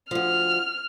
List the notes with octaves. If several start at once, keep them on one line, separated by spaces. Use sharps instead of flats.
D2 F3 F6